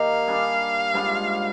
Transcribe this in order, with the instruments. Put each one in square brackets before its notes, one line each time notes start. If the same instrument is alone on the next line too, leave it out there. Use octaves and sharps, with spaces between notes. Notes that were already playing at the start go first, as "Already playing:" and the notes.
Already playing: [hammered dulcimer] D#3 A#3 D#4 G4 [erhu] F5
[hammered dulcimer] G3 D4 G#4
G#2 G3 D4 F4